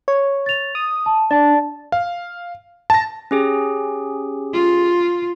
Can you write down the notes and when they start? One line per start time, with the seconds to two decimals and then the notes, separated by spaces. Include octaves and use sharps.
0.08 C#5
0.46 A6 F7
0.75 D#6
1.06 A5
1.31 D4 D5 A5 A6
1.92 F5
2.90 A5 A#6
3.31 C#4 G4 G#4
4.53 F4